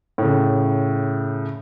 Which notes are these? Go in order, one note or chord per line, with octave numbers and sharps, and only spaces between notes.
A2 C#3